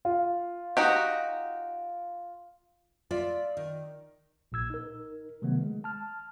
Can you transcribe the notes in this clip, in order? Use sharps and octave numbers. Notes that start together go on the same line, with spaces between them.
F4
D#4 F#4 G4
F4 D5 E5
D#3
A#1 A#2 E6 G#6
D#4 A#4
C3 D#3 F#3 G3 A3 B3
G#3
A5 F6